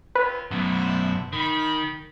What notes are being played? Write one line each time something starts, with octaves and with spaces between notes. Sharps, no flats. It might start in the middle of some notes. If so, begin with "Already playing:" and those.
C4 C#4 F4 B4
F#2 B2 D4 E4 C5
D#3 G5 B5